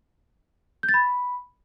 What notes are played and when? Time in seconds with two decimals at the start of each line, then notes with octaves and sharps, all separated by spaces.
0.83 G6
0.89 A6
0.94 B5